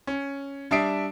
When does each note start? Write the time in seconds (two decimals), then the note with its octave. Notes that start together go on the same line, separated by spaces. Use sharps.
0.07 C#4
0.71 G3 D4 E5 D#6 C7 D7